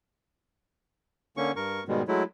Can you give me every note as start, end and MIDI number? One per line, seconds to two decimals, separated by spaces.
1.37 1.52 50
1.37 1.52 58
1.37 1.52 61
1.37 1.52 85
1.56 1.84 43
1.56 1.84 70
1.56 1.84 85
1.88 2.02 44
1.88 2.02 47
1.88 2.02 51
1.88 2.02 55
1.88 2.02 56
2.08 2.23 54
2.08 2.23 56
2.08 2.23 57
2.08 2.23 64